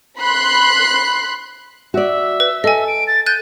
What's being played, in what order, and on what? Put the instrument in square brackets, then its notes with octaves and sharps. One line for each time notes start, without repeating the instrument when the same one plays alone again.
[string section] B5 C6 F#6 C7
[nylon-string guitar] F#4 D5 [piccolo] E5
[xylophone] B4
[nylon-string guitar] A4 [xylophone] D#5 G#5
[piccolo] D7
A6
[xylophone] F#6 A6 D#7 [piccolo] G6